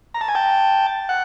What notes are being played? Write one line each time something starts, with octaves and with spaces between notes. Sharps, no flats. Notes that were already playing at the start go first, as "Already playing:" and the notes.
A#5
A5
G#5
G5 A5
F#5